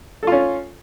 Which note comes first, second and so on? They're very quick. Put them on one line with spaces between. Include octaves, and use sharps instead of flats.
A4 F4 C#4